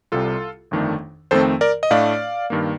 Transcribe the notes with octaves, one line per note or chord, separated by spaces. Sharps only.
C2 C3 G3 F4 A4
G1 F2 D#3 A3 D4
F2 D#3 A3 C4 A4 C5
A#4 D5
D#5
A2 A3 D4 D5 F5
G2 D#3 A#3